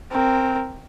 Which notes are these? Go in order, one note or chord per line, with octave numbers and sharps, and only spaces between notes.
C4 A#4